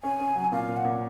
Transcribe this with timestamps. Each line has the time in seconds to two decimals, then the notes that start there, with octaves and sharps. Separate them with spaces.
0.03 C#4 G#5
0.20 C#4
0.36 F#3
0.52 A#2 F5
0.68 A#2
0.77 F#5
0.85 A#2